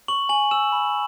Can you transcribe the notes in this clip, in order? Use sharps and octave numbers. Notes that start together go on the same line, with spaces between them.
C#6 F#7
G#5 F#7
E6 E7
B5